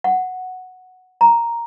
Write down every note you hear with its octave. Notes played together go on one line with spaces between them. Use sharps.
F#5
A#5